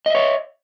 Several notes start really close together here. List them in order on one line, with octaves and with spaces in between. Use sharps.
D#5 E5 C#5